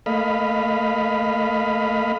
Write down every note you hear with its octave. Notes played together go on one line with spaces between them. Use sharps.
A3 A#3 D#5 F5 B5